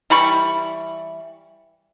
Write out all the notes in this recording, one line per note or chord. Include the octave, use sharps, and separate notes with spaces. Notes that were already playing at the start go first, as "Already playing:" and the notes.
E3 G3 B5 C#6